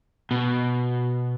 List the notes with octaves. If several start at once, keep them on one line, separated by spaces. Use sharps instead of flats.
B2